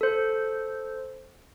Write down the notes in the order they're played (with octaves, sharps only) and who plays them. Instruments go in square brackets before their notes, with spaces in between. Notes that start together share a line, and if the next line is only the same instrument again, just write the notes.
[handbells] A4 C5